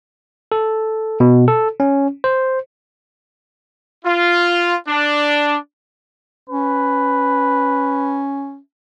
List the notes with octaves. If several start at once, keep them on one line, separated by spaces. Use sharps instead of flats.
A4
B2
A4
C#4
C5
F4
D4
C#4 B4